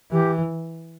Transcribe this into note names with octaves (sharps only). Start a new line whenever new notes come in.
E3 G4